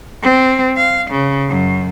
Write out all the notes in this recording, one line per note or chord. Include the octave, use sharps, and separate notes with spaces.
C4
F5
C#3
F#2